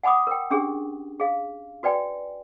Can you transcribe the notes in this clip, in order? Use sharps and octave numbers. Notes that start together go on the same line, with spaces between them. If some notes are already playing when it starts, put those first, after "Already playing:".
F#5 G#5 B5 D6 D#6
A#4 G5
C#4 D4 G4 G#4
G#4 F5
F#4 B4 D5 G5 G#5